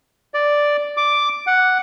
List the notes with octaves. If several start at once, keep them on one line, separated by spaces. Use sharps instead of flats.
D5
D6
F#5